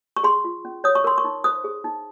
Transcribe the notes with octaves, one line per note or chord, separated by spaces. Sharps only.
C#6
G#4 C6
F4
C#4
C#5 D#6
C#6
A#4 C6
C#6
D#4
C5 D#6
G#4
D#4